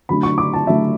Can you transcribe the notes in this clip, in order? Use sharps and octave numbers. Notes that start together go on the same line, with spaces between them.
D3 F#3 A3 D4 B5
C#6
D6
A5
D3 F#3 A3 D4 E5